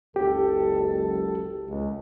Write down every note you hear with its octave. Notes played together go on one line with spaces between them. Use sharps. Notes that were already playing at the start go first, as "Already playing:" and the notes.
F#1 C#2 G4 A4
C#2